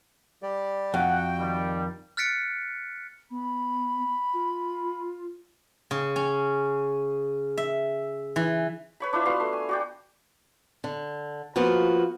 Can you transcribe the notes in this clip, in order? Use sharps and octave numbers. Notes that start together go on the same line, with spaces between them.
G3 G4 D5
F2 F#4 F#5 G5
D#3 G3
F6 F#6 A6 B6 C#7 D7
B3 B5
F4
C#3
C#4
E5
E3
B4 C#5 B5
D4 E4 F4 B4
B3 F#4 F5 C6
A3
G#5
F#4 D5 G5
D3
F3 A#3 B3 F4 F#4